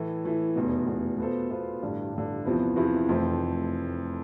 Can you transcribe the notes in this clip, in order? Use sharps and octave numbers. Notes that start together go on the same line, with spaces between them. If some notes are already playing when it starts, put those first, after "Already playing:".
Already playing: A2 E3 A3
A2 E3 A3
F1 E2 B2
F1 E2 B2
B2 B3 F4 A4 C5
B2 B3 F4 A4 C5
A1 G2 D3
A1 G2 D3
E2 C3 F3 B3 E4
E2 C3 F3 B3 E4
F1 F2 E3 A3 C4